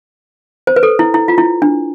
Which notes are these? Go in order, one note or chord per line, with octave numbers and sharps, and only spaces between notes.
C5
B4
A4
E4
E4
F4
E4
D4